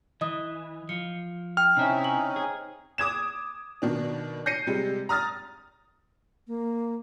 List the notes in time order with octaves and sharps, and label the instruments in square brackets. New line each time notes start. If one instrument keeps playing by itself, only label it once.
[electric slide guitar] E3 [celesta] D#5 D#6
[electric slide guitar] F3 [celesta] C#7
[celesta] G5 [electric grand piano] F6
[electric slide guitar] C3 E4 [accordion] C4 C#4 D#4
[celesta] F#7
[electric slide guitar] G#4
[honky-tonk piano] D6 D#6 G#6 E7
B2 D#3 D4
G6 A#6 C7 C#7 D#7
C3 G3 G#3
A#5 D#6 F6 A6
[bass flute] A#3